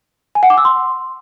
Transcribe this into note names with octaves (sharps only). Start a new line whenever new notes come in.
G#5
F#5
D6
E6
C6